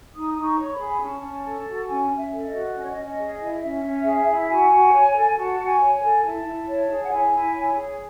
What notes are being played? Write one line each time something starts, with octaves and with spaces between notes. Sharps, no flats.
D#4 D#6
D#4 D#6
C#6
C#5
C#6
B5
G#4
G#5
C#4 A5
C#4
A4 A5
F#4
A5
C#4 G#5
C#4
E5
A4
D#5
F#4
C#4 D#5
C#5
D#5
C#4
D#5
G#4
D#5
E4
C#4 E5
C#4
G#4
E4
F#4 G#5
F#4
C#5
A4
G#5
F#4 A5
F#4
G#5
C#5
G#5
A4
E4 A5
E4
C#5
G#4
F#5
E4 G#5
E4
C#5
G#4